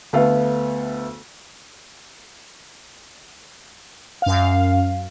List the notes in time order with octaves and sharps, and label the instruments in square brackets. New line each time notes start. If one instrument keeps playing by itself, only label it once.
[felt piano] D2 A3 B3 F5
[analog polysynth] F#2 F5